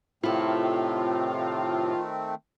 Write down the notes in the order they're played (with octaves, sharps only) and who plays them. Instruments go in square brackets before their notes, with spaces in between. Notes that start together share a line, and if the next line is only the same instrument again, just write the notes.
[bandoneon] A2 C3 [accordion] D#3 A3 C4 [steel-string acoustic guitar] E4 A4 [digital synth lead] F4